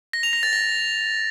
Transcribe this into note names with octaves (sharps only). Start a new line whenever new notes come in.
A#6
F7
A#6
A6
A#6